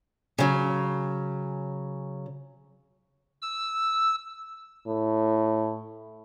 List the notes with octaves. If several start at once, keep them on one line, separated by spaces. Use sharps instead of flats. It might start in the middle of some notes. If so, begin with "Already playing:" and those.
C#3 F#3
E6
A2